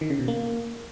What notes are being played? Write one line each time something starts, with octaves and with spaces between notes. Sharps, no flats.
D#3
C#3
B2
A#3